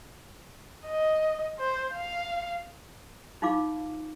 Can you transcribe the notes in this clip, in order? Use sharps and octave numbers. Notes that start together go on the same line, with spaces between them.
D#5
C5
F5
D#4 F4 F5 D6